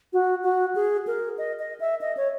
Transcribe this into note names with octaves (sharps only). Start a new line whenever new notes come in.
F#4
F#4
G#4
A#4
D#5
D#5
E5
D#5
C#5